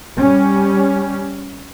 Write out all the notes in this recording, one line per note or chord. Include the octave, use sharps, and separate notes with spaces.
G3 C#4